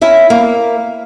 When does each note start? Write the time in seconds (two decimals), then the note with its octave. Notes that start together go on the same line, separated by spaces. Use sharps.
0.01 C#4 E4 E5
0.30 A#3